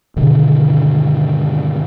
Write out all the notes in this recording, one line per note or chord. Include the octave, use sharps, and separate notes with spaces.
G2 B2 D3 D#3